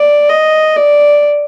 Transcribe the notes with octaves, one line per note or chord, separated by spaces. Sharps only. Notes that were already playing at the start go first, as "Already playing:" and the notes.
Already playing: D5
D#5
D5